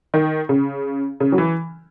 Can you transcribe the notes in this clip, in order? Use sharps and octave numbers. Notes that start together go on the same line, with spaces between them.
D#3
C#3
C#3
F#3
E3